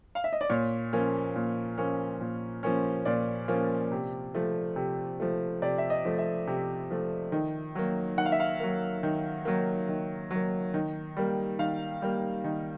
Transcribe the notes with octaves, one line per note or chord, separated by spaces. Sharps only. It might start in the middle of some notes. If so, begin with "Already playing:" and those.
F5
E5
D#5
D5
A#2 C#5
F3 A#3 C#4
A#2
F3 A#3 C#4
A#2
F3 A#3 C#4
A#2 D5
F3 A#3 C#4
C3
F3 A3
C3
F3 A3
C3 D5
E5
D#5
F3 A3
E5
C3
F3 A3
D#3
F#3 A#3
D#3 F#5
F5
E5
F5
F#3 A#3
D#3
F#3 A#3
D#3
F#3 A#3
D#3
G3 A#3
D#3 F5
G3 A#3
D#3